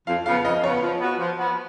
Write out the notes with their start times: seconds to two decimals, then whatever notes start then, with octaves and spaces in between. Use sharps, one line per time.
0.07 F2 F5
0.26 C#3 F3 B3 F5
0.45 F2 D#5
0.64 C#3 F3 B3 C#5
0.82 F3
1.01 B3 F#4
1.20 F3
1.39 B3 F#4